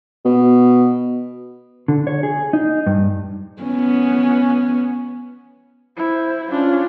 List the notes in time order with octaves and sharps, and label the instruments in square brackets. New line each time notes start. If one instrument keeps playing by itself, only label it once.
[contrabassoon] B2
[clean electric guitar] D3
C#5
G#4
D#4
G2
[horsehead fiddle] B3 C#4
[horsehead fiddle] E4 [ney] C5
[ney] C#4 [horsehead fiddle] D4 F4